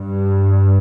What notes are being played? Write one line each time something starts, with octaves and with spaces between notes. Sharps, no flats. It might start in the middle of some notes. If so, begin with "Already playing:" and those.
Already playing: G2